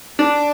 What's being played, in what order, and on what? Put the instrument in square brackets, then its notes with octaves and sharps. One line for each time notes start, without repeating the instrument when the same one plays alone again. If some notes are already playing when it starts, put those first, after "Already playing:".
[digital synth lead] D4